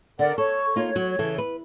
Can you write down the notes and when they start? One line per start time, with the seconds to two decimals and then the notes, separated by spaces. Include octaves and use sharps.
0.19 D3 A#4 D5 F#5
0.38 A4 C#5 C#6
0.76 A#3 D#4 F4 C#5
0.96 F#3 F#4
1.19 C#3 E3 A4
1.38 B4